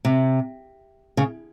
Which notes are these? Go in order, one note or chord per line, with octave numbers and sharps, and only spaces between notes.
C3
C#3